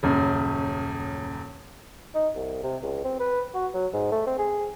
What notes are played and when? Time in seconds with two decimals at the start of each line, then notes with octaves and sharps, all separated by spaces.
0.03 D#1 F#2 C#3
2.15 D#4
2.36 C2
2.63 C3
2.83 C#2
3.04 C4
3.20 B4
3.54 F#4
3.74 F#3
3.93 G#2
4.12 A3
4.27 C4
4.38 G#4